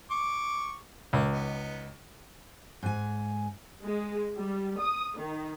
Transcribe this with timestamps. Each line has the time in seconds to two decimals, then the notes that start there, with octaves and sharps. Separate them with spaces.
0.11 C#6 D6
1.13 C#2 A#3
1.32 B3 D#4
2.83 G#2 G#5
3.83 G#3
4.36 G3
4.80 D#6
5.17 D#3